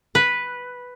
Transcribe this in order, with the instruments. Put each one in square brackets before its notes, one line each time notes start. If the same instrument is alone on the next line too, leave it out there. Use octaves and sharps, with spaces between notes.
[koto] B4